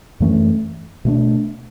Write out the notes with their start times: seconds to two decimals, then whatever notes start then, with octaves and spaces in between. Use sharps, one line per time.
0.20 F#2 E3 A3 C#4
1.05 B2 A3 D4